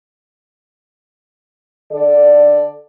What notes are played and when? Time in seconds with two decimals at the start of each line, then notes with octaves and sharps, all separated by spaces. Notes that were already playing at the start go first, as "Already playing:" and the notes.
1.92 D3 A4 D5